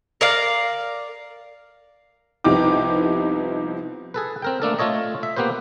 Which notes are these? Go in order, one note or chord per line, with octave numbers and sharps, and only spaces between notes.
A#4 D5 F5
C2 F3 B3 D#4 G4 D6
G#4 A4 B4
C4 A#4 G5
A3 A#3 D4 A4
A3 F4 A4 C#5 D#5
E5
A#3 B3 G4 B4 C5